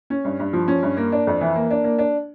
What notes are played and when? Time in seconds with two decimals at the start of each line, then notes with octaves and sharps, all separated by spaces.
0.10 C#4
0.25 G2
0.40 G2
0.53 F3
0.68 C#4
0.83 G2
0.97 A#3
1.12 D4
1.27 F2
1.41 E3
1.55 A#3
1.71 D4
1.84 A#3
1.99 D4